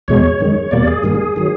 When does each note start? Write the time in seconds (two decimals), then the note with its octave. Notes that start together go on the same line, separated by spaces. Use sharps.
0.08 E2 B2 G#3 C#5
0.40 F#2 D#3 G#3
0.71 E2 B2 G3 A#3 D5
0.87 G#4
1.03 G2 D#3 G3 A#3
1.36 D#3 F#3